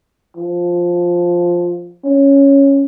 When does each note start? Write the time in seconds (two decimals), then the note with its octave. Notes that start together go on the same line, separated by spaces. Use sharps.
0.37 F3
2.04 C#4